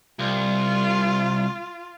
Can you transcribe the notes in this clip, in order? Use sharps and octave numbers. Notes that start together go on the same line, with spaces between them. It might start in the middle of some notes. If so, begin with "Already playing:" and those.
C2 F4